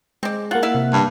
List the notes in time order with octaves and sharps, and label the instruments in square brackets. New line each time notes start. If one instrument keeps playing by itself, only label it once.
[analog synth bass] G#3 [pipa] C4 D5
[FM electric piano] A#3 F#5 F#6 [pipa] F4
[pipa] E4 E5 F5
[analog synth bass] C3
[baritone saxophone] G2